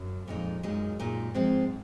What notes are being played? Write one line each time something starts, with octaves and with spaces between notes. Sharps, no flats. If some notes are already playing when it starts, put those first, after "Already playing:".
Already playing: F#2
F2 A#2 G#3 D#4
F#2 A#2 G#3 D#4
A#2 G#3 D#4
G#2 F3 G#3 C4